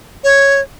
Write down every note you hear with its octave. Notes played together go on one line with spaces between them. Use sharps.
C#5